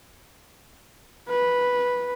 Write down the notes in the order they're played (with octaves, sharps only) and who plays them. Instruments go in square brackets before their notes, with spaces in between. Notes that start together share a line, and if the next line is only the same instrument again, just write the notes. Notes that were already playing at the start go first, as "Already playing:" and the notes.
[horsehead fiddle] B4